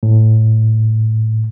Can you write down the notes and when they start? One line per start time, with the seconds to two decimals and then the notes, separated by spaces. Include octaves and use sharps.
0.03 A2